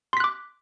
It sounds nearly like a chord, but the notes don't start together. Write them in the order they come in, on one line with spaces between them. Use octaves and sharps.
C6 B6 F#6 D6